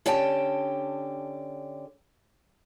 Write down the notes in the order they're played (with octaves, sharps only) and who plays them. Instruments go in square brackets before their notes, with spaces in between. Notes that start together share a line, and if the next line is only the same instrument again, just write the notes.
[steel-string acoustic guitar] D3 C#4 G4 G5 A5